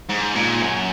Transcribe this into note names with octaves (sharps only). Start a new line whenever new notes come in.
G#2
A#2
F#2